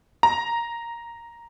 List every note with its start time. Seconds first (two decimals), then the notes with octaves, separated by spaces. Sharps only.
0.23 A#5